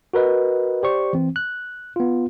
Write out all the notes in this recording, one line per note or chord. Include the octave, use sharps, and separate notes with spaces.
F#4 A#4 B4 D#5
G4 C5 D5 C#6
E3 C4
F#6
B3 F4